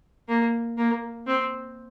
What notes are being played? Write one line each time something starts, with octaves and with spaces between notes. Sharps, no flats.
A#3
A#3
C4